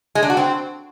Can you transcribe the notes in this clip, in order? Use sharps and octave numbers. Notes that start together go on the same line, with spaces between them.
G#3
D4
F#4
C4